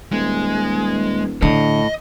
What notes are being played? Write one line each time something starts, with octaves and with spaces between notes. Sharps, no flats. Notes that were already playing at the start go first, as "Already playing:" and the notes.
D#1 G#3
A2 D3 D#5